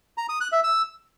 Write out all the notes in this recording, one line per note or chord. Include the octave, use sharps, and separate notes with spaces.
A#5
D#6
F#6
E5
E6